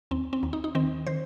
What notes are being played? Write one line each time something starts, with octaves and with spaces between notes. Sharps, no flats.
D#2 C4
C4
D#2
D#4
D#4
D#3 C4
D#3 C5